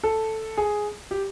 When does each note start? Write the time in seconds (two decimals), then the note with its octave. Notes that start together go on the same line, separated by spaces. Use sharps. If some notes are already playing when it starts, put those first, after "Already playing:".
0.03 A4
0.57 G#4
1.11 G4